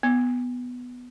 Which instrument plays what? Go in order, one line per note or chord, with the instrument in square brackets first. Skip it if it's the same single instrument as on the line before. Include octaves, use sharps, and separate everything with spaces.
[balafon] B3